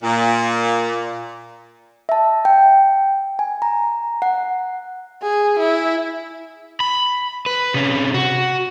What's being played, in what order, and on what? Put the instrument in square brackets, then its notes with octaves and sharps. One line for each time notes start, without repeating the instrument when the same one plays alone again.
[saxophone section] A#2
[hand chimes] E5 A5
G5
G#5
A#5
F#5
[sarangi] G#4
E4
[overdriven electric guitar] B5
B4
C3 C#4
F#4